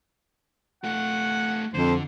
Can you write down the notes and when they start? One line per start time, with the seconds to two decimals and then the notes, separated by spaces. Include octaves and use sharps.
0.84 A3 F4 F#5
1.74 F2 D3 C5